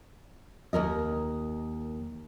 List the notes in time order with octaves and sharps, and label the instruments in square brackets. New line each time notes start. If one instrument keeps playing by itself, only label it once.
[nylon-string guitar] D#2 B2 A#4 D#5